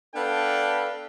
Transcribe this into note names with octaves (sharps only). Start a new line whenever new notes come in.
B3 D4 A4 B4 F5 G5